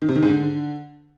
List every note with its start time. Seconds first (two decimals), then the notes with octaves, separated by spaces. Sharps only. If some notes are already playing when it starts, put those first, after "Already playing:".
0.02 D#3
0.09 C3
0.16 D#3
0.22 G#2
0.29 D3